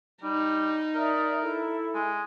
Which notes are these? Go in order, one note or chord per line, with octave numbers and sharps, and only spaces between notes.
G3 D#4
A#4 D5 E5 D#6
E4 A4
G#3